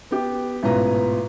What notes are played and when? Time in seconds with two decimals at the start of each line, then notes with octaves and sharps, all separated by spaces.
0.11 B3 G4
0.63 A1 G#2 B2 F4 B4 A#5